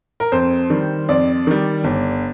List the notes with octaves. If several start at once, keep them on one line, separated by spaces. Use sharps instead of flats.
A#4
F2 C5
D#3 G3
F2 D5
D#3 G3
G1